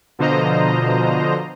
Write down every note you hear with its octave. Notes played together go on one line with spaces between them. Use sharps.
B2 D3 F3 C5 D#5 A#5